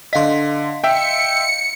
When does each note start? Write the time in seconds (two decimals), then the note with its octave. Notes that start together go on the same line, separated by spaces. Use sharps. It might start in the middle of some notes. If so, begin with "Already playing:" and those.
0.13 D3 D#5 F5 C6 B6
0.84 E5 G5 C#7